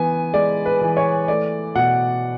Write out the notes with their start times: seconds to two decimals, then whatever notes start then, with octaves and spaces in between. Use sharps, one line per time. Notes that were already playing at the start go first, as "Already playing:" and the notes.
Already playing: E3 B3 G#5
0.34 G#3 D5
0.66 B4
0.81 E3
0.97 C#5
1.28 A3 D5
1.75 B2 F#5